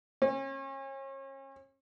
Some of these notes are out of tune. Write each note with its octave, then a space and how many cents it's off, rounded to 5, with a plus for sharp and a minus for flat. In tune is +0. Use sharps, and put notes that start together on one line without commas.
C#4 -35